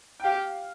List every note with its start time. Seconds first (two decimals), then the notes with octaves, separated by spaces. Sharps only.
0.20 G5
0.24 G4 F5